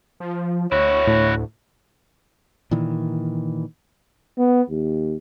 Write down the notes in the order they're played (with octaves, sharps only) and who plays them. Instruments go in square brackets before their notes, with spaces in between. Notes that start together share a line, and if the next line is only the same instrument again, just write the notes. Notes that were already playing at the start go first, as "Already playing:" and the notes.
[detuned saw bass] F3
[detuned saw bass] D2 [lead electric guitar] E4 F#4 [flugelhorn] C#5
[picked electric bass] A2
[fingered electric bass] A#2 D#3 E3
[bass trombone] B3
D#2